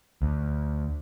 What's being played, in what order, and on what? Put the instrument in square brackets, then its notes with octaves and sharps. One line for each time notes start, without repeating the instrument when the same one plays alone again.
[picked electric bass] D2